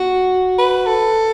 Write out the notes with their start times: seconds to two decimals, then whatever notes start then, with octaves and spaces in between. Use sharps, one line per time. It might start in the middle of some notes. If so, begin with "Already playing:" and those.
Already playing: F#4
0.58 B4
0.87 A4